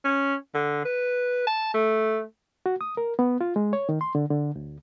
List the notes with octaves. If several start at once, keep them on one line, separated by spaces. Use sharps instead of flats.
C#4
D3
B4
A5
A3
F#4
D#6
A#4
B3
F4
G#3
C#5
D#3
C6
D3
D3
D2